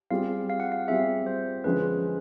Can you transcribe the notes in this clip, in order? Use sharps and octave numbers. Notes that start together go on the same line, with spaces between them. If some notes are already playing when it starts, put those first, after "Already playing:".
G3 C4 F4 G#4 F5
F5
F#5
F5
G3 C4 F4 G#4 E5
C5
D3 F3 G#3 C#4 B4